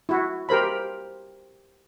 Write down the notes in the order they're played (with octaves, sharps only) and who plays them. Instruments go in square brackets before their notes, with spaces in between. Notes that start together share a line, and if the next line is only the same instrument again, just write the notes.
[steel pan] E4 F#4
G4 A#4 C5 B5